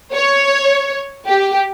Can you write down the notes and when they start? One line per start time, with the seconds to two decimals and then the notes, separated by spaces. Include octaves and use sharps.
0.14 C#5
1.28 G4